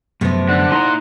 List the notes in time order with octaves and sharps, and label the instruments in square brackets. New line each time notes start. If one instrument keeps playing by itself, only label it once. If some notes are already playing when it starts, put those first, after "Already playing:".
[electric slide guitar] F#2 A3 B3 [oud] C3 F3
[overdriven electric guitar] D3 [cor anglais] F#5
[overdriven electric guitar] A#2 C6 [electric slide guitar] D#4 E4 A#5